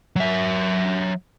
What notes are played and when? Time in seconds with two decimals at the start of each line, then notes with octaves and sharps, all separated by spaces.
0.16 F#3 E5